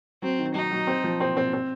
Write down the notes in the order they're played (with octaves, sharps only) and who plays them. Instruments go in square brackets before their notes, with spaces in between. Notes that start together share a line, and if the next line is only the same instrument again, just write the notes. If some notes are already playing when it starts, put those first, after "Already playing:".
[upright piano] F#3 [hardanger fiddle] C4
[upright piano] D#3
[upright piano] F#3 [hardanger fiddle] D#4
[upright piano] F#3
C4
F3
C4
C4
C4